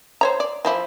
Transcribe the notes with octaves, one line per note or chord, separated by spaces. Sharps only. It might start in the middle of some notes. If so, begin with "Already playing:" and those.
C5 C#5 A#5
D5
E3 F3 E4